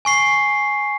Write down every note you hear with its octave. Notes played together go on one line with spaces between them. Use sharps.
G#5 C#6 C7